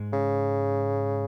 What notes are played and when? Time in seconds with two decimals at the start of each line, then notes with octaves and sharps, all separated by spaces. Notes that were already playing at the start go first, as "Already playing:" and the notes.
Already playing: G#2 G#3
0.13 C#3